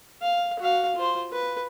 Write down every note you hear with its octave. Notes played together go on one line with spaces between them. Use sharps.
F5
F#4 F5
F4 C5
B4